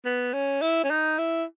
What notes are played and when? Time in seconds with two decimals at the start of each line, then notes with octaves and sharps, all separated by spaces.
0.05 B3
0.33 C#4
0.62 E4
0.84 C#4
0.90 D#4
1.18 E4